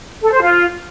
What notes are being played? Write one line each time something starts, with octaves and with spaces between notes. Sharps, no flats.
A4
C5
F4